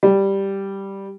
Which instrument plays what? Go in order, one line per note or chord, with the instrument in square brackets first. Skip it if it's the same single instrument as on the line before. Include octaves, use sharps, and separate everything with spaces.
[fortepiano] G3